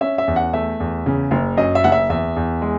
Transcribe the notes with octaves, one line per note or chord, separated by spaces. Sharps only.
C#4 E5
E5
E2
F#5
A3 E5
E2
C#3
F#1
F#2 D#5
E5
F#1 F#5
E5
E2 E5
E2
G#3